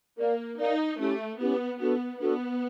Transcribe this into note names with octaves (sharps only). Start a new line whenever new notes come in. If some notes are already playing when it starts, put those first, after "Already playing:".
A#3 A#4 D5 F5
D#4 A#4 D5 F5
A3 C#4 E4 G4
B3 C#4 E4 G4
B3 D4 F#4 A4
B3 D4 F#4 A4